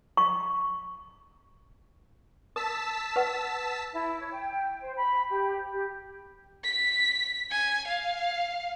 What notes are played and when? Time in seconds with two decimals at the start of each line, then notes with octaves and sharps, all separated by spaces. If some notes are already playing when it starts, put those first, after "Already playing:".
0.17 C#6
2.56 A#4 A5 E6 B6
3.16 B4 F#5
3.92 E4
4.20 C#5
4.32 G5
4.81 C5
4.96 B5
5.29 G4
5.71 G4
6.64 B6
7.51 G#5
7.87 F5